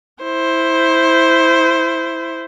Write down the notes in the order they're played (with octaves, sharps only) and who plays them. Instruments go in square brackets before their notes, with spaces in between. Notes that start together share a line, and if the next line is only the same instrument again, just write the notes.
[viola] E4 C5